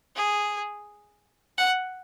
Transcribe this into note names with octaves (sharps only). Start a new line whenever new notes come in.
G#4
F#5